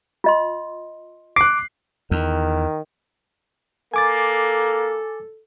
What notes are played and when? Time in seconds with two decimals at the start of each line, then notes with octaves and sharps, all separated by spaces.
0.24 F4 D#5 C6
1.36 D6 F#6 C7
2.11 E2 D#3
3.94 A#3 A4 G#5 D6 A6